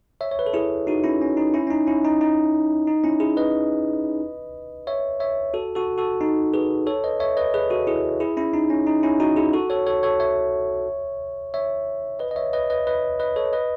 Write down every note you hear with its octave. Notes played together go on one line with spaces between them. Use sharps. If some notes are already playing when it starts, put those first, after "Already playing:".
C#5 E5
C#5
B4
A4
E4 G#4
D#4 F#4
C#4 E4
C#4
D#4
C#4 E4
C#4
D#4
C#4 E4
D#4
D#4
D#4
C#4 E4
E4 G#4
B4 D#5
C#5 E5
C#5 E5
F#4 A4
F#4 A4
F#4 A4
D#4
G#4 B4
A4 C#5
B4 D#5
C#5 E5
B4 D#5
G#4 B4
F#4 A4
E4 G#4
E4 G#4
C#4 E4
D#4
C#4
D#4
C#4 E4
D#4 F#4
E4 G#4
F#4 A4
A4 C#5
A4 C#5
A4 C#5
C#5 E5
C#5 E5
B4 D#5
D#5
C#5 E5
B4 D#5
B4 D#5
B4 D#5
B4 D#5
A4 C#5
B4 D#5